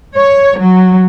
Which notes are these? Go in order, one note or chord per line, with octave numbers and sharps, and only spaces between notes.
C#5
F#3